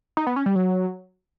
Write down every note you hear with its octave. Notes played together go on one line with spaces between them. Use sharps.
D#4
B3
C#4
G3
F#3